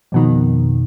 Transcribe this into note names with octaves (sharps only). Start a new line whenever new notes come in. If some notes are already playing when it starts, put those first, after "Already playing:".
F2 B2 D#3